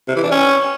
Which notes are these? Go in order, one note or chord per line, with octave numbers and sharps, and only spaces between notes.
C3
E3
D4
C#4